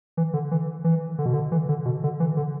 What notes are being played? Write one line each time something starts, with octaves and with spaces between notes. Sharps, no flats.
E3
D3
E3
E3
D3
B2
D3
E3
D3
B2
D3
E3
D3